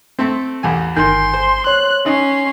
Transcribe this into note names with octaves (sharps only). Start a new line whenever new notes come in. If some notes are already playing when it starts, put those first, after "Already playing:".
A3 C4
A1 E2 G#5
G1 D#3 G#5 C6 G6
C5
C#5 C6 F#6
C#4 D#4 C7